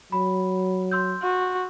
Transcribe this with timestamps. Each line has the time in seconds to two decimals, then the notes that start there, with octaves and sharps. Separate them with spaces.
0.12 F#3 B5
0.92 C6 E6 G6
1.22 F#4